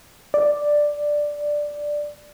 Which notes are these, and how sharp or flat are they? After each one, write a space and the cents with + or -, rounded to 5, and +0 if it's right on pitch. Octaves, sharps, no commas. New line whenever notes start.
D5 +5